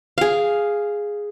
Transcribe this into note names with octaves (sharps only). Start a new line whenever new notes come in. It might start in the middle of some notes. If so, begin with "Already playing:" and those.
G#4 F5